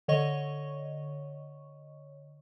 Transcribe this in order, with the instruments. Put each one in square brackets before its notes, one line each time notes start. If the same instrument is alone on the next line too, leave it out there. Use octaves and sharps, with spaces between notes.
[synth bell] D3 C#5 D#5 C#6